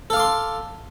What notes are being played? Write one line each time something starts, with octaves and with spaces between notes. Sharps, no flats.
A4 F5 C6 D6